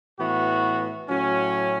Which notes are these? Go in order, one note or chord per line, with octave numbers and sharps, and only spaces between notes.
A2 E3 B3 F#4
A2 F#3 C#4